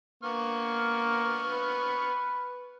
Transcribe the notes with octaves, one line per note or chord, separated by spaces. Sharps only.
A#3 B3 C#6 F6
B4